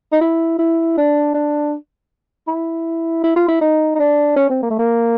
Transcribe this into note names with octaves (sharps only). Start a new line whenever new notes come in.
D#4
E4
E4
D4
D4
E4
E4
F4
E4
D#4
D#4
D4
C#4
C4
A#3
A3
A#3